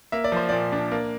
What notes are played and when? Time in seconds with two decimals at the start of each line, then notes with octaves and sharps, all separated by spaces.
0.12 A#3 E5
0.24 D5
0.32 F3 C5
0.49 A#2 D5
0.72 D4
0.92 A#3